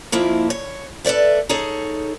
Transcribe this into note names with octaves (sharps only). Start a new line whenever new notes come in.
F2 A#3 E4 F4 E5
C#5
A4 B4 C5 D5 E5
D#4 G#4 A4 C#5